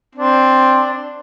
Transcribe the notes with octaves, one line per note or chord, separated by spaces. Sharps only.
C4 D4